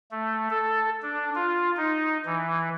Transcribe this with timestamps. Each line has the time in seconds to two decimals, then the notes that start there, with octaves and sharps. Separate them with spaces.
0.12 A3
0.50 A4
1.02 D4
1.35 F4
1.77 D#4
2.26 E3